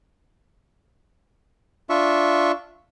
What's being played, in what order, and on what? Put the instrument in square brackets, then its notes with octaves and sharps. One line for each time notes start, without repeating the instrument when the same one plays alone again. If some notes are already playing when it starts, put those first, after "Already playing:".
[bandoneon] D4 F4 E5 C#6